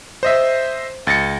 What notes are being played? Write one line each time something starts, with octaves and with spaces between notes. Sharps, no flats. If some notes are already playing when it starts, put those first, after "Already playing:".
C5 D#5 E5
C#2 A6 A#6 C#7